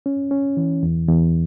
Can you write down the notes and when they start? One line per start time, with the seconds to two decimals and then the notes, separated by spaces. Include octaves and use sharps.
0.06 C#4
0.31 C#4
0.57 E3
0.83 E2
1.08 E2